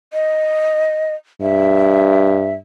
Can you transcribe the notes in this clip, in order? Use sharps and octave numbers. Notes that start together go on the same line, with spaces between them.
D#5
G2 E5